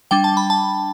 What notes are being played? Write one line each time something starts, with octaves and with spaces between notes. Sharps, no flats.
G3 D4 G5
A5
B5
A5